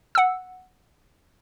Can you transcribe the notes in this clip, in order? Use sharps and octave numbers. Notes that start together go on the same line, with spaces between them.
F#5 E6